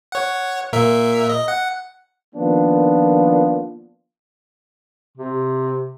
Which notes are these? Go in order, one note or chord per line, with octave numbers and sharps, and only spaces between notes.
C#5 F#5
A#2 A#4 E5
D#5
F#5
D#3 F3 A#3 B3 D4 F4
C3